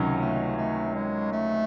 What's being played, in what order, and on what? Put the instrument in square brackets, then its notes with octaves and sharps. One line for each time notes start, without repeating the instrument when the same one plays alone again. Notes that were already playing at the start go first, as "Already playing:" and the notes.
Already playing: [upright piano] C#2 C3 D#3 F#3 C#4
[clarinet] A3
A3
G#3
A3